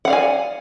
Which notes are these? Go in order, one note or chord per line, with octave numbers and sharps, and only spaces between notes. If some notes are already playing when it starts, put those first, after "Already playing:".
D5 F5 F#5 G#5